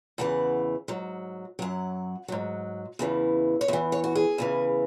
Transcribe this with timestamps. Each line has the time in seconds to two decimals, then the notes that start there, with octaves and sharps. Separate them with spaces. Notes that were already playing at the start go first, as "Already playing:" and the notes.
0.18 E2 C#3 E3 F#5
0.88 G#2 F#3
1.59 F#2 F#3 F#5
2.28 G#2 F#3
2.99 E2 C#3 E3
3.61 C#5
3.68 E2 E5
3.73 E3
3.92 C#5
4.04 F#4
4.15 G#4
4.38 E2 C#3 E3